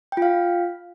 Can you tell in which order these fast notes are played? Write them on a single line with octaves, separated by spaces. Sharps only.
G5 F4 F5